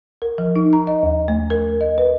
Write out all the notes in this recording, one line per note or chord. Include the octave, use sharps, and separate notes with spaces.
A#4
F3
D#4
A#5
D#5
D#2
A3
A#4
D#5
B4